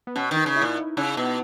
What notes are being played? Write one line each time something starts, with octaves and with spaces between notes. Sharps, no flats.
B3
B2 C#4
D#3
D#4
C#3
E4
A#2
C#3 D#4
B2 B3